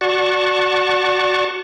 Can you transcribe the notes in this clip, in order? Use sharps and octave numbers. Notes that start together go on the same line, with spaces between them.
F#4 D5 F#5 A5 C#6